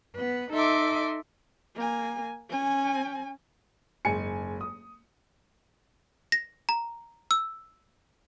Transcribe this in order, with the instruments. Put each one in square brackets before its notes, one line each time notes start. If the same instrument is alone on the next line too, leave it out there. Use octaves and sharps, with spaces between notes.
[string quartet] B3 B4
D#4 A4 D#5 E5 C6 D6
[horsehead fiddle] A#3 G#5
C#4 G#5
[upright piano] F#1 G#2 G#3 G#5 C#7
D#6
[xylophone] A#6
A#5
E6